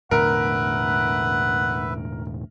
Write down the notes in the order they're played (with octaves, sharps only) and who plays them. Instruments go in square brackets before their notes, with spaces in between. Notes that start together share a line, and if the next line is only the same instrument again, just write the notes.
[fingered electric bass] E1 A2 D3 [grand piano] A#4 [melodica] B4 E5 [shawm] F#5